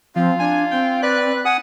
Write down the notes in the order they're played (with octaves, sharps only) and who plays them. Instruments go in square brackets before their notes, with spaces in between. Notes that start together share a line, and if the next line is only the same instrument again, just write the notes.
[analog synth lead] F3 [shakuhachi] C4 [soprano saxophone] F4
[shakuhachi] D4 [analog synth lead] G#5
[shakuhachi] C4 [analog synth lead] G5
[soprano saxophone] B4 [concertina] D5 [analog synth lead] F#6
[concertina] F#5 G#5 D#6